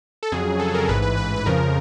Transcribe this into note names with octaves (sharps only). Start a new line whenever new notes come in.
A4
F2 C#3 F#3 G#4
A4
A#4
A1 G#2 E3 B4
B4
B4
B4
F2 C#3 F3 A#4